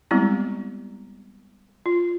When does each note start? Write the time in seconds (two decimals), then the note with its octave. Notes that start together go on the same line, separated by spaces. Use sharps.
0.11 G3 G#3 B3 C4 E4 G4
1.86 F4